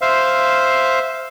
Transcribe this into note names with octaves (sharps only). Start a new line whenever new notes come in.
C5 E5 F5